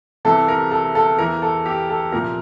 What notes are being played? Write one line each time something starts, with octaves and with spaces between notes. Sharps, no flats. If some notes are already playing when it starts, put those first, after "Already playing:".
C2 C3 E3 A4
A#4
A4
A4
E2 E3 A#4
A4
G4
A4
C2 A#2 F3 A#4